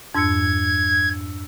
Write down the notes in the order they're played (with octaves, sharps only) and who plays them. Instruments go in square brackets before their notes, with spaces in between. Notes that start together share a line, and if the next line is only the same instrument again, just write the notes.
[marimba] F2 G#2 [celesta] D4 E6 C#7 [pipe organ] G#6